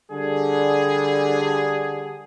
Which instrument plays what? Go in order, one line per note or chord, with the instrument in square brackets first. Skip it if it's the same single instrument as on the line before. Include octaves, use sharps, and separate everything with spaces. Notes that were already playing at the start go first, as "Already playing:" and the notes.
[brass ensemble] D3 G3 G#4